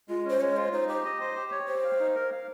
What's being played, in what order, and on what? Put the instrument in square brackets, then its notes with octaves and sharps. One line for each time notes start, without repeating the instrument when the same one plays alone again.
[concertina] G#3 [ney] F4
[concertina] C#4 [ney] C5
[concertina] G#3 [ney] C#5
[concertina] F4 [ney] C5
[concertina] D#4 [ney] C5
[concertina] G4 [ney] C5
[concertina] D#5
C5
G4
C#5
[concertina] G4 [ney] C5
[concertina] F5
D#4
A#4
F5